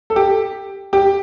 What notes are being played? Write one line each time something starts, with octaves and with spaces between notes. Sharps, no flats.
A4
G4
G4